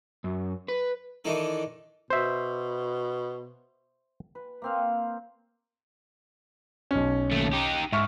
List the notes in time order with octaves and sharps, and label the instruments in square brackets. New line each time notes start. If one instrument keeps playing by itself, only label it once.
[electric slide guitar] F#2
B4
[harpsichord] D#3 E3 D4 D#4 A4
[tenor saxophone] B2 [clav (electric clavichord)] C5 E5
[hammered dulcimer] B4
A#3 C4 F5
[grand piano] B1 C#4
[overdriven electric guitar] D#2 A3
D#4 G4
[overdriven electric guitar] G#2 [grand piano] E5 C#6 F6